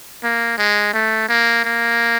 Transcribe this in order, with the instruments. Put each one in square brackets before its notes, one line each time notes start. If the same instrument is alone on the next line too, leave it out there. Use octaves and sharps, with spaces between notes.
[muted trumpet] A#3
G#3
A3
A#3
A#3